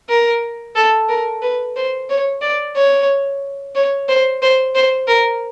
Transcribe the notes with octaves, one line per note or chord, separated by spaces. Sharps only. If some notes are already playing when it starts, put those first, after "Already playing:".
A#4
A4
A#4
B4
C5
C#5
D5
C#5
C#5
C5
C5
C5
A#4